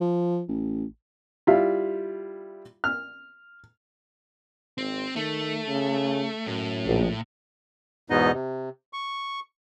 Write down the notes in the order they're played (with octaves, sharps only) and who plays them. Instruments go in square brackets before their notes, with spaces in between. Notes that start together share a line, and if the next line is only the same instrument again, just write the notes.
[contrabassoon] F3
A1
[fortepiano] G3 E4 F4 E5 F5
F6
[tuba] G#1 [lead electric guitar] C4
[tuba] D#3 [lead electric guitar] A3
[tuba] C#3
[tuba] F#2 [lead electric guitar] A2
[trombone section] A#1
[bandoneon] E2 G#2 B2 B3 D#4 D#5
C3
C#6